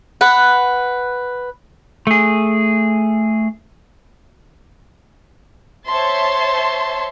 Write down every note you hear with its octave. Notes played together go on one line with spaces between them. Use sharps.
B4 F#5
A3 G#4
C5 C#5 E5 A5 C6